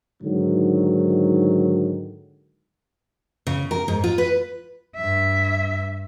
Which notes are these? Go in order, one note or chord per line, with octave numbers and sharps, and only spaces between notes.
G#2 D3 D#3 F#3
C#3
A#4
G#2
F4
B4
G2 E5